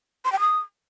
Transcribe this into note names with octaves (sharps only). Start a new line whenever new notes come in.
C6
G5
D#6